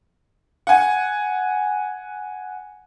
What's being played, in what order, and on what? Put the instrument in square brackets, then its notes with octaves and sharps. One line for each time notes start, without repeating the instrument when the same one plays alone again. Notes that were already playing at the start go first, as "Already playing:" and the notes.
[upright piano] F#5 G#5